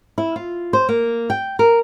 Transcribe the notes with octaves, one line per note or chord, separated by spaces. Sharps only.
E4
F4
C5
A#3
G5
A#4